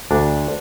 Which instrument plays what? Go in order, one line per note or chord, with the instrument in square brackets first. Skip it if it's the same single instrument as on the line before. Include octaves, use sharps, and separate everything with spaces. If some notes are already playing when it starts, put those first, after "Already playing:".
[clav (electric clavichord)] D2 D4